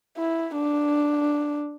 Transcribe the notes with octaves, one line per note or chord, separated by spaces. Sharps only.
E4
D4